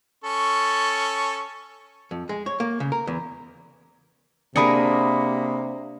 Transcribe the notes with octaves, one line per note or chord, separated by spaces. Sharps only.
C#4 A4 C#6
F2
G#3
C#5
A#3
C#3
A#4
E2
C3 A#3 D4 G#4 A#4 B5 D#6 C#7